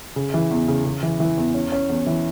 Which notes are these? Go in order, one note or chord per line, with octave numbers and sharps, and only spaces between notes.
C#3
E3
E2
C#3
C#3
E3
E3
E2
C#4
C#4
E2
E3